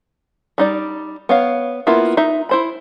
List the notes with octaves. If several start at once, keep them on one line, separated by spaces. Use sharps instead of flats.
G3 D#4 D5
B3 C#5 F5
A#3 B3 E4 F4
D#4 E5
E4 C5 B5